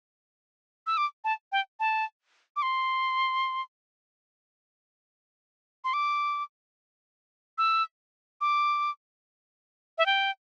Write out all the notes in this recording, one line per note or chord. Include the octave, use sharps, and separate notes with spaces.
E6
D6
A5
G5
A5
D6
C6
C6
D6
E6
D6
E5
G5